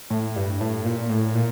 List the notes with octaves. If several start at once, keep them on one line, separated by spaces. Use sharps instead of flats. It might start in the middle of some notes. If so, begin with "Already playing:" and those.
A2
G2
A2
A#2
A2
A#2